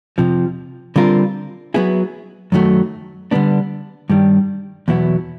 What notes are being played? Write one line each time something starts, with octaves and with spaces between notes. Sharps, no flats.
F2 C3 F3
D3 G3 C4 F4 A#4
F#3 B3 E4 G#4
F#2 D#3 F#3 A3
D3 G3 B3 D4
G2 D#3 G3
E2 B2 F#3 B3 E4